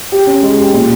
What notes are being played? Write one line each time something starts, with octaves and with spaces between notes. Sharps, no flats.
G4
C#4
G#3
G4
A#2